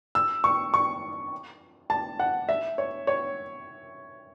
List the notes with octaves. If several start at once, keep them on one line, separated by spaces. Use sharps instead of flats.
E6
C#6
C#6
A5
F#5
E5
C#5
C#5